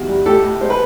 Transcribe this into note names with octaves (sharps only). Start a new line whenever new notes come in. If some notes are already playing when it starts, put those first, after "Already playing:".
Already playing: E2 C3 D#3 F#4
G3
A2 G4 A4
A2
G#3 C5
B4